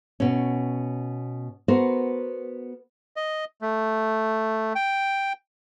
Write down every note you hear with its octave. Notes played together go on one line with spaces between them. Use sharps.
B2 C#4
B3 F#4 A#4 C5
D#5
A3
G5